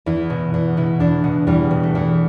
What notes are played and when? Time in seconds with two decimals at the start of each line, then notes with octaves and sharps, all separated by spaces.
0.06 E2 E4
0.30 B2
0.54 E2
0.77 B2 E4
1.00 E2 D4
1.24 B2 B3
1.47 E2 G3
1.71 B2
1.83 A3
1.95 E2